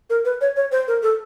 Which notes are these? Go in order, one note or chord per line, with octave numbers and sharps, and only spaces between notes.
A#4
B4
C#5
C#5
C5
A#4
A4